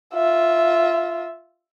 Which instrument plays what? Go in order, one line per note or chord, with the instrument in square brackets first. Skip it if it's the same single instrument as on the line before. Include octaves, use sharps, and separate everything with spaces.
[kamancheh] F4 E5